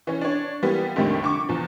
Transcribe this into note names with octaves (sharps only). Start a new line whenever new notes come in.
E3 C#4
D4 C#5
E3 G3 A#3 B3
A#1 F2 D#3 G3 A3
D3 C#6 D6
E2 F3